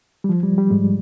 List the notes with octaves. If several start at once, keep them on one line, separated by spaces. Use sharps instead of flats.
G3
F3
G3
G3
G#2 G#3